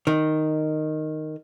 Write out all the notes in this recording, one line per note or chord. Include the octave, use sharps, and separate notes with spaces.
D#3